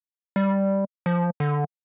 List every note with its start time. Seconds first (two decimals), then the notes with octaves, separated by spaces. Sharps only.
0.36 G3
1.06 F3
1.40 D3